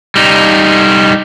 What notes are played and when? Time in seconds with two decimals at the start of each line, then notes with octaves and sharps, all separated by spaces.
0.16 G3 D#4